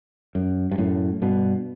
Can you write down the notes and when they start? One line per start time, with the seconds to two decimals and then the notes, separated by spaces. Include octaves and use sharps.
0.35 F#2
0.71 G2
0.78 F#2 A2
1.22 G2 B2